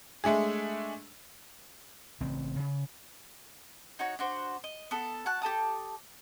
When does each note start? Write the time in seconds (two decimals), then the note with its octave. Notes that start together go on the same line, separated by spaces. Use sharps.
0.24 G#3 A3 D4 G#4
2.21 A1 C#3 C4
2.59 C#3
3.99 D#4 F#4 C#5
4.19 D4 F#4 C5
4.64 D#5
4.91 B3 A4
5.26 F#4 A5 F#6
5.42 G4 A4 A5 D#6